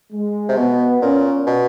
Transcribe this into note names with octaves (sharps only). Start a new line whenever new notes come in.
G#3
C3
B2 B3
A#2 C#4
B2